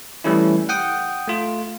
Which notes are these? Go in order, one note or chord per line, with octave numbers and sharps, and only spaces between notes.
E3 G3 A3 C#4 E4
F#5 G5 D#6
A3 F4